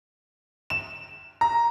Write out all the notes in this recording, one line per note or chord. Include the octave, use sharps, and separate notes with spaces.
E7
A#5